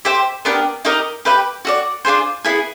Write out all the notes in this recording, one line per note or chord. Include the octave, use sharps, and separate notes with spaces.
G4 C5 E5
B3 D4 G4 A#4
D#4 G4 A#4 D#5
G4 B4 E5 G5
F#4 A4 D5
D4 F4 G#4 C5
B3 E4 G#4